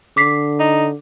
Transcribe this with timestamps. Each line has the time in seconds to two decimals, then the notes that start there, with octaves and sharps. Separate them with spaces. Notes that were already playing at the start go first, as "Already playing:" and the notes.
0.17 D3 D6 B6 C7
0.60 D#4